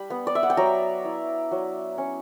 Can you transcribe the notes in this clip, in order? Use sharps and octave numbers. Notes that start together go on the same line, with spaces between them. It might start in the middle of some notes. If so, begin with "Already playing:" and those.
Already playing: G3 D4 B5
B3
D5
E5
F#5
G5
F#3 A#5
E4
F#3
C#4